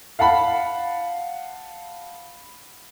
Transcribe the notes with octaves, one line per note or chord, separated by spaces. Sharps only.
F5 F#5 A5 B5